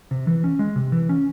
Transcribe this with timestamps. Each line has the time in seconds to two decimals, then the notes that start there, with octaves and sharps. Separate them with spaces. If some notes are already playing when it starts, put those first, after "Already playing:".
0.11 C3
0.27 E3
0.44 C#4
0.59 G#3
0.76 C3
0.92 E3
1.09 C#4